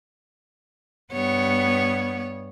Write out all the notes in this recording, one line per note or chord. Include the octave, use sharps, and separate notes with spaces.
G2 B3 C#5